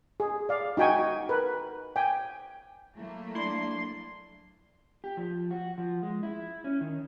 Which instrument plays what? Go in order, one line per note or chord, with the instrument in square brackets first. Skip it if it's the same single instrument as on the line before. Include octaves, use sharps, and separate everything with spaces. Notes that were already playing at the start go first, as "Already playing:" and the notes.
[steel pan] G#4
D5 F5
D#4 F#4 G5 G#5 C#6
A#4 B4
G5 G#5
[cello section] F#3 A3 A#3 [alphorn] E4
[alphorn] D4 [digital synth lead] E4 [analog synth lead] C6
[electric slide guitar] G4
F3
F#4
F3
G#3
E4
C#4
D#3